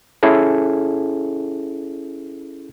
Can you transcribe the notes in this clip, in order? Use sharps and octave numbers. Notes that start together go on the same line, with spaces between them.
C#4 E4 G#4 A4